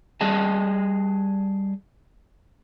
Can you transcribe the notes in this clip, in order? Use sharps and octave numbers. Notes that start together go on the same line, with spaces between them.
G3 G#4 D#5 A5